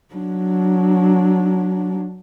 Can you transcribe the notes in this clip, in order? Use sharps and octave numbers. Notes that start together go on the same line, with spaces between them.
F#3 D4